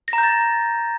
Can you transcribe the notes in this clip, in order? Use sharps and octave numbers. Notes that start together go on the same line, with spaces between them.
A#6
A#5
G6
A6